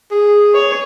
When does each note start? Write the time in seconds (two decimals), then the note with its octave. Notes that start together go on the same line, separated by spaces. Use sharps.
0.11 G#4
0.54 C#5